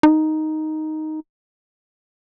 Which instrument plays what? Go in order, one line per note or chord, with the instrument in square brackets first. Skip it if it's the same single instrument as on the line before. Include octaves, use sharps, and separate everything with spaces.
[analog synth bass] D#4